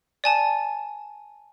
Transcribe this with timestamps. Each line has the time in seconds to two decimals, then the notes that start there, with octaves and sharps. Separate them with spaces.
0.24 D5 G#5 A5